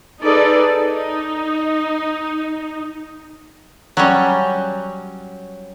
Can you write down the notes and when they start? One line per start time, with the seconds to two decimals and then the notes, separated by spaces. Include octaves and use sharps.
0.21 D#4 G#4 A4 B4 D5
0.78 D#4
3.97 F#3 G3 C#4